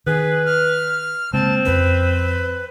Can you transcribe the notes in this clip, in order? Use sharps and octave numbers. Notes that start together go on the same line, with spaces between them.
D#3 G#4 B4
F6
C#3 G#3 A#3 C4 A5
F2 C#4 B4